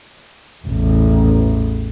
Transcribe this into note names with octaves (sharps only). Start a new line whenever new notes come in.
A1 E2